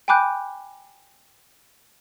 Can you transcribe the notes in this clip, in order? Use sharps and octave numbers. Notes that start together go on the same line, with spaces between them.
G5 G#5 B5 D6 F#6 G6